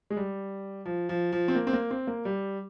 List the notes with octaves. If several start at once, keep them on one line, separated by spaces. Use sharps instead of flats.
G#3
G3
F3
F3
F3
C4
A#3
C4
A#3
C4
A#3
G3